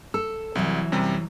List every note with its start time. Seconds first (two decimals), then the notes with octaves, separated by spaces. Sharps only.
0.14 A4 E6
0.55 C2 E3 F#3
0.92 F#2 C3 G3